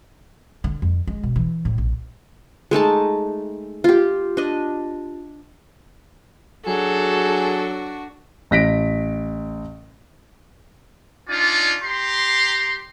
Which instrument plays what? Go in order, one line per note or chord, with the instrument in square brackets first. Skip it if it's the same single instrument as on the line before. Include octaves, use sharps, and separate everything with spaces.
[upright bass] D3
F2
G#3
B2
E3
A2
A#1
[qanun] G#3 A3 D#4 A5
F4 G4
D4 D#5
[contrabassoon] F#3 [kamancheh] D4 F#4 [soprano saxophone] G#4 [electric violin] A4
[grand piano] A1 A#6 B6 D7
[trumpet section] D4 D#4 F4 D5 G#5
G4 A#5 C6